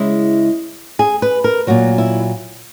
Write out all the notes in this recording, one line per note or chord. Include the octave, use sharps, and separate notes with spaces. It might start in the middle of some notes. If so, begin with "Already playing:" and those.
Already playing: C#3 G#3 E4
G#4
B4
A#4
A#2 F#3 F#4
E4